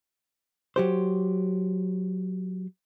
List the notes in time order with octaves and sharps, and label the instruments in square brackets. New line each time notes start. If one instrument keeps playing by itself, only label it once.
[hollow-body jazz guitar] F#3 G4 C5